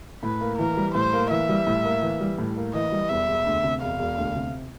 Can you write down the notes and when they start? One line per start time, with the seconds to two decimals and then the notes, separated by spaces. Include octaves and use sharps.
0.23 A2 B4
0.41 A#3
0.58 E3 A#4
0.77 G3
0.95 A2 C5
1.13 A#3
1.31 E3 E5
1.49 G3
1.67 A2
1.84 A#3
2.02 E3
2.20 G3
2.38 A2
2.57 A#3
2.74 E3 D#5
2.92 G3
3.10 E1 E5
3.28 E1
3.46 D2
3.64 C3
3.81 E1 F5
3.99 E1
4.18 D2
4.36 C3